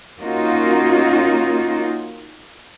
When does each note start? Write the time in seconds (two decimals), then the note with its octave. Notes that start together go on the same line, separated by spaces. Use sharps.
0.20 A#3 C#4 D#4 F4 F#4